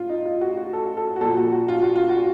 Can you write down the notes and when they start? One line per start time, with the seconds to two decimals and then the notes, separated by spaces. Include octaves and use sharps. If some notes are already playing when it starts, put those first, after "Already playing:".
Already playing: A2 F4
0.09 D#4
0.26 F4
0.41 F#4
0.57 F#4
0.73 A4
0.85 F#4
0.97 A4
1.16 F#4
1.21 A#2 A4
1.25 F3
1.37 F#4
1.53 F#4
1.68 F4
1.82 F#4
1.96 F4
2.09 F#4